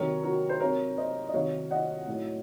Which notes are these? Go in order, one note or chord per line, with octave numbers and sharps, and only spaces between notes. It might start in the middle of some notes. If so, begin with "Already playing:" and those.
Already playing: C3 D#3 F#3 A#4 C#5
F#4 A#4
C5
C3 F#3 A#4 C#5
C5 D#5
D#5
C3 D#3 F#3 C#5 F5
D#5 F#5
A2 F#3